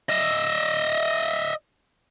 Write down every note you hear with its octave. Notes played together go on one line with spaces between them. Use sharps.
D#5 E5